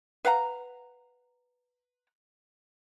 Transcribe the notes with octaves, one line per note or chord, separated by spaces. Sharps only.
B4 F5 F#5 A#5